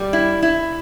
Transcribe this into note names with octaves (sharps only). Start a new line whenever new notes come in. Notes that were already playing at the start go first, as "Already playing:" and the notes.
Already playing: G3
E4
E4